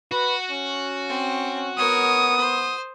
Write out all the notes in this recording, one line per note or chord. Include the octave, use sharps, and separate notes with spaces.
F#4 B4
C#4
C4
B3 A#4 C#5 D#6
C5